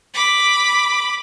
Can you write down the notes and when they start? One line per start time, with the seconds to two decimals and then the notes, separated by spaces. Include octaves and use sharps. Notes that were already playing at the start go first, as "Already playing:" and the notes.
0.14 B5 D6